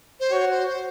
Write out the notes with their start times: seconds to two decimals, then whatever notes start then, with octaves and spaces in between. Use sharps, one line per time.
0.20 C5
0.31 F#4 C#5
0.51 C5
0.69 C5